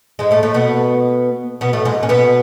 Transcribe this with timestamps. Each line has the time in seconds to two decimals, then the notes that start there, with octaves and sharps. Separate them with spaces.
0.19 G#2 G#3
0.31 A2 A3
0.43 A2 A3
0.54 B2 B3
1.61 B2 B3
1.73 A2 A3
1.85 G#2 G#3
2.03 C#4
2.09 B2 B3